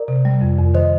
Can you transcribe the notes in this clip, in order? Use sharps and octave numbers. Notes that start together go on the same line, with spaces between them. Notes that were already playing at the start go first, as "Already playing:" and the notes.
Already playing: A#4 D5
C3
G3
F2
F2
D#3 C5 D#5